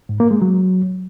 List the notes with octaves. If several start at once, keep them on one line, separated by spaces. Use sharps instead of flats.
G#2
A#3
G#3
F#3